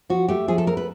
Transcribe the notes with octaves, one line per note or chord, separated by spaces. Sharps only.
F3 F#4
A3 G4
F3 G#4
A4
A3 A#4
B4